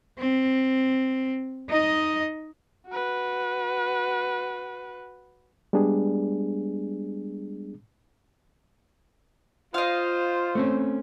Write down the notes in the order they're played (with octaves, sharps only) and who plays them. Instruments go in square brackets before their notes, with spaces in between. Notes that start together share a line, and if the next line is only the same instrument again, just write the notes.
[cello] C4
D#4 D#5
[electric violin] F#4 B4
[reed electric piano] G3 G#3 B3 D4 G#4
[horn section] F4 [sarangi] C5 [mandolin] D#5 F5
[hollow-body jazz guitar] A3 C4 C#4